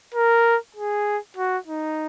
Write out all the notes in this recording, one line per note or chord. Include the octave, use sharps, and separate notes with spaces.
A#4
G#4
F#4
D#4